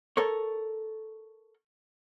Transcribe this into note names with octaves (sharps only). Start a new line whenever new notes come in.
A4 A#4 C#5